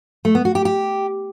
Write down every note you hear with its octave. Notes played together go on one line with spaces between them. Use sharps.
A3
B3
F#4
G4
G4